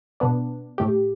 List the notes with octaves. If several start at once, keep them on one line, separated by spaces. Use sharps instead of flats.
B2 B3 D4
A2 A3 G4